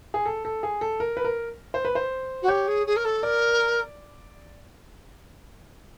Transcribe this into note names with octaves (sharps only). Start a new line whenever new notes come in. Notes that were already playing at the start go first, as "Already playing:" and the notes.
G#4
A4
A4
G#4
A4
A#4
B4
A#4
C5
B4
C5
F#4
G4 C#5
G#4
G#4
A#4
A4
A#4 D5